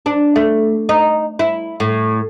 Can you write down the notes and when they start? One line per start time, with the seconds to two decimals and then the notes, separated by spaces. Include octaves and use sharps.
0.06 D4
0.36 A3
0.89 D#4
1.39 E4
1.80 A2